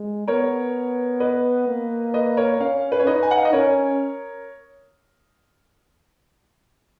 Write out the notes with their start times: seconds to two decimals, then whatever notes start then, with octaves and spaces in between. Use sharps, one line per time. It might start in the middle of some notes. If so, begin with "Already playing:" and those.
Already playing: G#3
0.28 B3 A#4 C#5
1.20 B4 D#5
1.68 A#3
2.14 B4 D#5
2.37 A#4 C#5
2.60 C#4 C#5 F5
2.92 B4
3.00 C#5
3.07 D#4 B4 D#5
3.23 G#5
3.31 F#5
3.38 F5
3.45 D#5
3.53 C#4 A#4 C#5